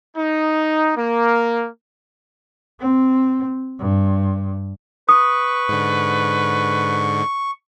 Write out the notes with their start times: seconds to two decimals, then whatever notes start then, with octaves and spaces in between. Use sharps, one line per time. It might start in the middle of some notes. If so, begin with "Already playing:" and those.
0.17 D#4
0.96 A#3
2.80 C4
3.80 G2
5.09 B4 C#6 D#6
5.69 G#2 D3